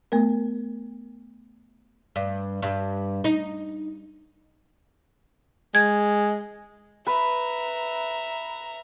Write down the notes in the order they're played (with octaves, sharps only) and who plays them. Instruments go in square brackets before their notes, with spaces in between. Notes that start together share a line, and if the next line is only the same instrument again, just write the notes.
[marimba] A3 B3 A#4
[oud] G2
G2
D#4
[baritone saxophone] G#3 [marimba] G#6
[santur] B4 [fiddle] E5 A#5